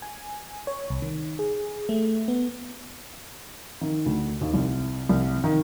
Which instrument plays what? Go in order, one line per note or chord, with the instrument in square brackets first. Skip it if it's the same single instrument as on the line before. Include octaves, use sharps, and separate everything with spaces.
[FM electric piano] G#5
C#5
C2
D#3
G#4
A3
B3
[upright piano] D#3
D2
D#2
C2
C2
D#3